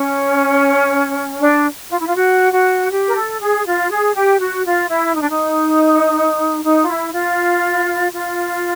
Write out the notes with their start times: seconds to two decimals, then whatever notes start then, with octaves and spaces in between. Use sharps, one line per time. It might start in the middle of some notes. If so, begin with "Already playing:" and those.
Already playing: C#4
1.40 D4
1.90 F4
1.99 E4
2.07 F4
2.15 F#4
2.52 F#4
2.90 G4
3.07 A#4
3.15 A4
3.40 G#4
3.64 F4
3.89 G#4
4.15 G4
4.39 F#4
4.64 F4
4.89 E4
5.14 D#4
5.22 D4
5.30 D#4
6.63 D#4
6.81 F4
6.88 E4
7.13 F4
8.12 F4